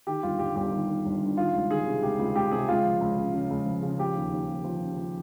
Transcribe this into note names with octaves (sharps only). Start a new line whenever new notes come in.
D#3 G4
G1 F4
G1 G4
G1 G4
D#3
D#3
G1
G2
D#3 F4
C#2
D#3 G#4
C3
C#2 G4
C#2 F4
C#2 G4
C3 G#4
C#2 F4
F3
C#2
C#3
C#3
C#2
F3
C#3
F3 G4
D#2
D#2
F3
F3
C#3
F3